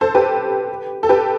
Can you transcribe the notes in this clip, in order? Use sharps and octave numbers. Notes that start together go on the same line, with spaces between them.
A4 C5
G4 B4
A4
G4 B4